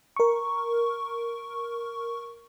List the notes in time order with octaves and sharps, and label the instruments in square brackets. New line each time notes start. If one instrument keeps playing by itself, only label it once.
[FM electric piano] A#4 C#6